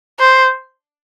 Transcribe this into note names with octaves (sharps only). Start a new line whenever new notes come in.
C5